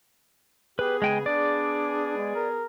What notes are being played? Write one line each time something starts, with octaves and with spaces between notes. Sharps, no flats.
B3 G4 G#4 B4
C#3 G#3 G5 G#5
D4 D5
G#3
A#4